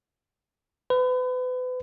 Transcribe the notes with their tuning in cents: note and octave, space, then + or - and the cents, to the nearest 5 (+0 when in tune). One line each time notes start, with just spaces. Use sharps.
B4 +35